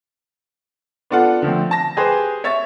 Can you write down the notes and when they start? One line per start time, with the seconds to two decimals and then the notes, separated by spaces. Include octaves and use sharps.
1.11 B3 D4 F4 A4 F#5
1.42 D3 F3 A3 C4
1.71 A5 A#6
1.97 G4 G#4 B4 C5
2.44 C#5 E5 C#6 A6